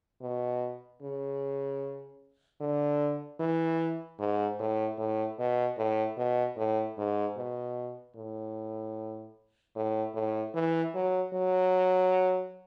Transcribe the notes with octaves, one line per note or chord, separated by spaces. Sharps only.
B2
C#3
D3
E3
G#2
A2
A2
B2
A2
B2
A2
G#2
B2
A2
A2
A2
E3
F#3
F#3